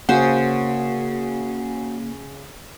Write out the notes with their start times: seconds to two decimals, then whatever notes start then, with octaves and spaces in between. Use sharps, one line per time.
0.09 C#3 A#3 F#4 C5 F#5